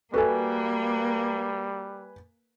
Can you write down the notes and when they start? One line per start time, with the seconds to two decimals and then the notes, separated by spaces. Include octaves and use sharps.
0.14 G3 A#3 F#4 A4 B4 E5 G#5